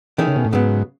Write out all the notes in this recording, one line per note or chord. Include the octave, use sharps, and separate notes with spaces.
D#3 E3 A3 C#4 G#4
C#3
B2
A2
G#2 C#3 F#3 B3